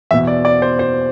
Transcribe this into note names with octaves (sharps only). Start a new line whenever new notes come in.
E2 B2 E5
D5
D5
C5
C5